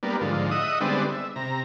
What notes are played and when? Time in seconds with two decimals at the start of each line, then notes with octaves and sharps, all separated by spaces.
0.03 G3 A#3 B3 D4
0.21 G#2 D3 F3
0.51 D#5 E5 F#5 D#6
0.81 D3 G3 G#3 B3 C4 D4
1.12 E5
1.36 C3 A#5